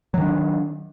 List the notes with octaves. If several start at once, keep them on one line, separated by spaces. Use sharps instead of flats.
D#3 F#3 D4